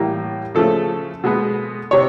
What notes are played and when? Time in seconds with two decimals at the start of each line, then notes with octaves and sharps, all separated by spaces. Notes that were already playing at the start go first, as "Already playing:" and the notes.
Already playing: A2 E3 G3 A#3
0.55 C#3 F3 A3 A4
1.24 B2 G#3 B3
1.91 C3 C#5